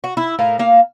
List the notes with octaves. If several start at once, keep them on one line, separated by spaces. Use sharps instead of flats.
F#4
E4
A2 A#4 F5
A#3 F5